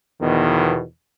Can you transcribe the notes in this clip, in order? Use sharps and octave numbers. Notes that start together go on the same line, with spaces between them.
E2 B2 D#3 F3